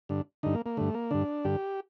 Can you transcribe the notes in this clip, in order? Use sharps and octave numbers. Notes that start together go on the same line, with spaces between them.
G2 D3
G2 D3 D#4
A#3
A#3
G2 D3 A3
A#3
G2 D3 D4
G2 D3 G4